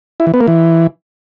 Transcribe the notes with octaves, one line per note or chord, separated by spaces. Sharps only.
E4
E3
B3
A#3
E3